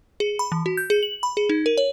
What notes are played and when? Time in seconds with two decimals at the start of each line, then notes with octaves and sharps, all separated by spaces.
0.20 G#4
0.39 B5
0.52 E3
0.66 F#4
0.77 G6
0.90 G#4
1.03 F#7
1.23 B5
1.37 G#4
1.49 D#4
1.66 A#4
1.78 C#5